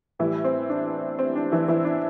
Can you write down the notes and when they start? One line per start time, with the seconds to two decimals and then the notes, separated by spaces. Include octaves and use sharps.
0.19 A2 E3 G3 E4
0.45 C4
0.70 D4
1.19 C4
1.36 D4
1.52 E3 E4
1.68 E3 E4
1.85 D4